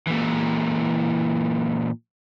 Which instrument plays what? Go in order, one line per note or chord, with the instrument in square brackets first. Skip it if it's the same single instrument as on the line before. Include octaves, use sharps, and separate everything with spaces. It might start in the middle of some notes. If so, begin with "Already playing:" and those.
[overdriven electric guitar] A#2 E3